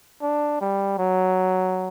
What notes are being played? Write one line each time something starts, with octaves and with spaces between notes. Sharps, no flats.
D4
G3
F#3